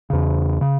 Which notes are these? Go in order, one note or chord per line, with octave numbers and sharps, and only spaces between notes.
E2 C#3
C#3